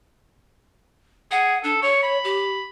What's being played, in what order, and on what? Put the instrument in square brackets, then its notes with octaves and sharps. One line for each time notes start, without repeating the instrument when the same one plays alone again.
[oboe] G#4 [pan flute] F#5
[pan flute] D4 [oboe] A4
[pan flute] C#5 [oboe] C#6
[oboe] B5
[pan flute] G4